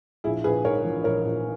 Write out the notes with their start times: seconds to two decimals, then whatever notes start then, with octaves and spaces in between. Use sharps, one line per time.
0.24 A#1 E4 G#4
0.44 A#1 G#4 B4
0.65 G#2 A#4 C#5
0.85 E3
1.04 A#1 A#4 C#5
1.25 A#1